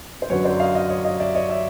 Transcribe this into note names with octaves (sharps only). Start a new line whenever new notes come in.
C5
F#2 D3 F#3 B4 C#5
C5 D5
D#5 F5
D#5 F5
C#5 D#5
D#5 F5
D5 E5
C#5 D#5
D5 E5